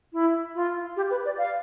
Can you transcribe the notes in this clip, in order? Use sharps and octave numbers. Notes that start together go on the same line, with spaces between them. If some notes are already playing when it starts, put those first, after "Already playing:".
E4
F4
G4
B4
D5
F5